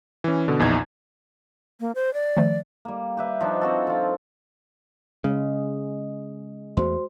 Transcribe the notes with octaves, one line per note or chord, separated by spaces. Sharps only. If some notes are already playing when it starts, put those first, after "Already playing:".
E3 C#4
B2 D3
A#1 E2 D#4 G#6
A#3
C5
D5
D#3 F3 A3
G3 A#3
G4 B4 E5
F3 D4 D#4
C4 F#4 A4
F3 F4
C#3 G#3
E2 A3 F#4 C5 C6